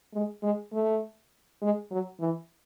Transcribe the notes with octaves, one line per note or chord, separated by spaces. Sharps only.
G#3
G#3
A3
G#3
F#3
E3